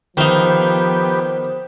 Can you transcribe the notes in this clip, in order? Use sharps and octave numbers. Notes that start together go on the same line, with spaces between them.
D#3 F3 B3 D#4 G4 C5